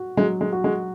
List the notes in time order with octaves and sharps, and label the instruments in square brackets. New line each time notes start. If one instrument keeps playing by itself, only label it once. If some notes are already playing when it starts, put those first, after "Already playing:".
Already playing: [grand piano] F#4
[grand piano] F#3 [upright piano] G#3
[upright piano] G#3
[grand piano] F#4
[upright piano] G#3